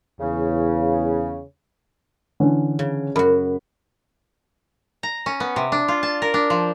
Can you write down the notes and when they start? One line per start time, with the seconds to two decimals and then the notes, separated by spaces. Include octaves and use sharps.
0.20 E2 C#3
2.40 D3 E3 C#4
2.79 C#3
3.16 F#2 F#4 B5
5.03 A#5
5.26 C#4
5.40 B3
5.56 C3
5.72 D4
5.88 F4
6.03 A5
6.22 A#4
6.34 D4
6.50 F3